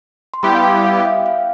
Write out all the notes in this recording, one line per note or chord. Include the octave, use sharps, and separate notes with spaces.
C6
G3 B3 E4 G4 B5
F5
G5
F5
F5
E5
F5